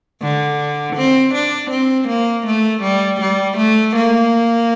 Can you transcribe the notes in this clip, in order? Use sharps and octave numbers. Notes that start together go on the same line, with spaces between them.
D3
C4
D4
C4
A#3
A3
G3
G3
A3
A#3